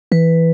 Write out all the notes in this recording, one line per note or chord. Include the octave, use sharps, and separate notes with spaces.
E3 B4